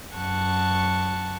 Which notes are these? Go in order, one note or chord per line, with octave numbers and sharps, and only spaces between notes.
F#2 F#3 F#5 A5 C#6